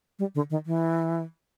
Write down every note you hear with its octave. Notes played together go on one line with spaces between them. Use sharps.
G3
D3
D#3
E3